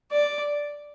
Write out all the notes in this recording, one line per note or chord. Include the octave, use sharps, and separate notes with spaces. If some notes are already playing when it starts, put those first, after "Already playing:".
D5